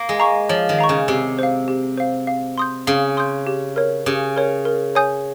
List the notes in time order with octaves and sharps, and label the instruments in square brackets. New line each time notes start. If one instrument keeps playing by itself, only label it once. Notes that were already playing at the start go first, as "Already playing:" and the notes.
Already playing: [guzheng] A#3
G#3
[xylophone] F5 A#5 C#6
[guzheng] F3 [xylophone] C#5
[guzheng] D#3
[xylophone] F5 A#5 C#6
[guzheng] C#3
[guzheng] C3 [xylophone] G4
[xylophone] C5 F5
G4
C5 F5
F5
C6 D#6 G6
[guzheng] C#3 [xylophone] F5
[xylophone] C6 D#6 G6
G4
A#4 C#5
[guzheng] C#3 [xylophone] G4
[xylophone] A#4 C#5
A#4
C#5 G#5 D#6 G6